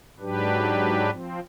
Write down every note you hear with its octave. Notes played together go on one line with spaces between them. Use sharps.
G#2 F#3 D4 G4 B4
F3 C4